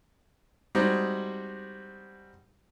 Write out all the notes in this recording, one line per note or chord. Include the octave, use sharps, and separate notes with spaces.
G3 G#3 C4 D#4 F#4